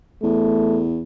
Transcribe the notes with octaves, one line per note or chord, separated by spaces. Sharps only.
E2 A3